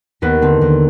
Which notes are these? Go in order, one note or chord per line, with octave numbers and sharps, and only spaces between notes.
D#2 B3
D3 C4
D#2